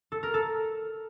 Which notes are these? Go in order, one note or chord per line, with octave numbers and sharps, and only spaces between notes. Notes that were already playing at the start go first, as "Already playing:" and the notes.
A4
A#4
A4